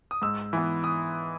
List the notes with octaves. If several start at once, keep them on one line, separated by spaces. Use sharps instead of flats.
D#6
G#2 E6
E3 B3
D#6